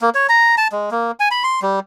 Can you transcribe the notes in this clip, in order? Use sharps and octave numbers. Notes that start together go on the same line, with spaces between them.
A#3
C#5
A#5
A5
G#3
A#3
G#5
B5
C6
G3